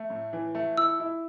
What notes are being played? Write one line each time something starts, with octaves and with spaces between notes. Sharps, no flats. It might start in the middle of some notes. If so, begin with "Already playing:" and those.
Already playing: A3
A2
E3
A3
E4 E6
E4